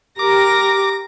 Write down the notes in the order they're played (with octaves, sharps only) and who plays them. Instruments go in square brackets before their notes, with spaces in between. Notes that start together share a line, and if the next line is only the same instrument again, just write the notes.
[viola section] G4 [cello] A#4 [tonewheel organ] D6 [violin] A#6